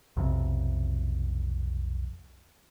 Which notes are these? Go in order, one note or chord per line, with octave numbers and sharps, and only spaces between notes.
B1 F2 C3